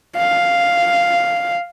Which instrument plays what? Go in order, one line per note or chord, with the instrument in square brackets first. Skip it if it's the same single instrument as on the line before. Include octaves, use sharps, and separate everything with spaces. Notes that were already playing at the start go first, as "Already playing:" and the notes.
[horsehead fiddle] F5